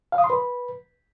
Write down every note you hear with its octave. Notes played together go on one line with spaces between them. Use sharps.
F5
D#6
C6
B4